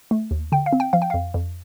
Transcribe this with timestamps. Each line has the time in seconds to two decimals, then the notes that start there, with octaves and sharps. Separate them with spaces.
0.11 A3
0.31 D#2
0.52 D3 G5
0.66 F5
0.73 C4
0.80 G5
0.93 F3 F5
1.02 G5
1.10 F2 F5
1.34 F2